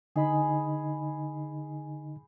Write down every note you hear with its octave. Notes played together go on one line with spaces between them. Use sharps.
D3 D#4 G#4 D#5 B5